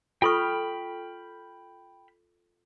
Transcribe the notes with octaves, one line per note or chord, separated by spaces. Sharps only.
F4 A4 G5 B5 C#6 F6